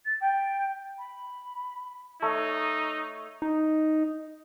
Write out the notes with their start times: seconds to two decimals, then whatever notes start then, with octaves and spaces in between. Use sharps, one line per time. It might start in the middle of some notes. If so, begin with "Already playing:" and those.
0.05 A6
0.21 G5
0.98 B5
2.22 A3 D#4 C#5
3.42 D#4